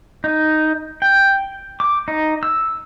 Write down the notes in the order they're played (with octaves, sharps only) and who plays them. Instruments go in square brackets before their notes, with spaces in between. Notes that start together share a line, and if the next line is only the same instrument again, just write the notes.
[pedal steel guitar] D#4
G5
D6
D#4
E6